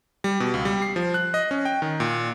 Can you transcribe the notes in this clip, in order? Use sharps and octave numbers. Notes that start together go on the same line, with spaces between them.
G3
B2
C#2
G3
C7
F3
F#6
D#5
C#4
G5
D#3
A#2